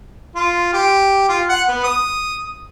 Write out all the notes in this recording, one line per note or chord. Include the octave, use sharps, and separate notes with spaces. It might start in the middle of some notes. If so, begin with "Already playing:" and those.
F4
G4
F4
F#5
B3
D#6